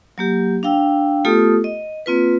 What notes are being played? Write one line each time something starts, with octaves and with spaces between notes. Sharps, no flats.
F#3 A#3 G4
D4 F5 G5 E6
A3 B3 F4 G4 A4 D#6
D#5
A#3 C4 F4 B4